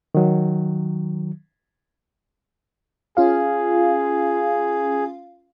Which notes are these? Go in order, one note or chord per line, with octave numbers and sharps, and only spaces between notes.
D#3 F#3
C#4 F4 G#4 F5